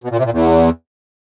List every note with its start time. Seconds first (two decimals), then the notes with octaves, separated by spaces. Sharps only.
0.04 B2
0.11 A#2
0.18 C3
0.25 A#2
0.32 E2